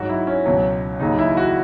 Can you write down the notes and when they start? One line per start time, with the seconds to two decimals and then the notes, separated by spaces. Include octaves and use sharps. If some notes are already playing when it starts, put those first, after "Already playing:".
Already playing: G#2 F#3 F#4
0.09 E4
0.27 C#4
0.46 C#2 B2 F#3
1.00 D#2 C#3 F#3 D#4
1.19 E4
1.37 F#4